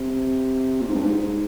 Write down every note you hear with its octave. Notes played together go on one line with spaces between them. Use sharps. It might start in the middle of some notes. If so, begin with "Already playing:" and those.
Already playing: C3
A#2
G#2
G2
G#2